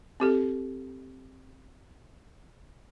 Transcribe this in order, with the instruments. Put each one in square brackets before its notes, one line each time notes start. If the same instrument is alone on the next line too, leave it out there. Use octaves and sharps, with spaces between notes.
[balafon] C4 G4 A4